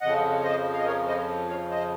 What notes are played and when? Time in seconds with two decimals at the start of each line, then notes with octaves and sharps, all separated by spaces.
0.01 F2 C#3 F3 D#5 F#5
0.44 C5 D#5
0.72 F5
0.79 D#5
0.86 A#4 C#5
1.07 C5 D#5
1.49 C#5 F5
1.70 C5 D#5